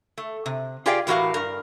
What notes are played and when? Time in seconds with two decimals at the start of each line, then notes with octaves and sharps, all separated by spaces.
0.18 A3
0.46 C3
0.86 F4 G4 G#4 D5 F5 G5
1.07 A2 E3 F#4 G4 A#4 F5
1.34 G2 A#4